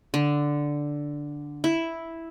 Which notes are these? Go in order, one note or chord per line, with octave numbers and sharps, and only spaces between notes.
D3
E4